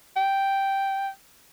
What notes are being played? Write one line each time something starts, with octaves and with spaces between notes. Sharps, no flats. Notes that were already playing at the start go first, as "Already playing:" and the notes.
G5